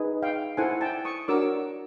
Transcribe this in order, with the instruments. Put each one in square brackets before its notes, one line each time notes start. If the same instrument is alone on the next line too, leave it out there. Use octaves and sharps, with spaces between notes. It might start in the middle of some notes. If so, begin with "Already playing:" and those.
Already playing: [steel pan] D#4 G#4 B4
F5 G5
E4 A4 C5 F#5 G#5
G5 A5
C#6 D#6
D4 F#4 A#4 C#5 D6 E6